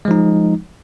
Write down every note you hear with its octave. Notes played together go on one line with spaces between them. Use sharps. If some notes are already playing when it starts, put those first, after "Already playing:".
F3 G#3 D#4